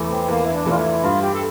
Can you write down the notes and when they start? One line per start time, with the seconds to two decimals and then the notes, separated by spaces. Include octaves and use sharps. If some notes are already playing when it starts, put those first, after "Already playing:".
Already playing: E2 E3 A3
0.09 C4
0.28 E2 A#3
0.45 E4
0.53 D4
0.66 E3 A3 F4
0.78 E4
1.03 G2 F4
1.22 G4
1.34 A4